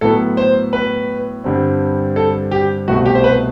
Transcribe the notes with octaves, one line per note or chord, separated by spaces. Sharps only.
A2 F#3 B3 A4
C5
B4
G2 D3 G3 C4
A4
G4
C2 B2 A3 C4 F#4
G4
C5
B4